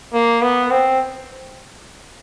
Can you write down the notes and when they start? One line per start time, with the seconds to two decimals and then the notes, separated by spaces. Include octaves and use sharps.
0.13 A#3
0.42 B3
0.71 C4